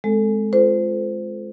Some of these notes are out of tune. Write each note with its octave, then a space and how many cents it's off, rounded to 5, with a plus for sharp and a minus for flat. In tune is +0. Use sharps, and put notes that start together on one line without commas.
G#3 +20 C4 +0 A4 +10
F4 +0 A4 +0 C5 -25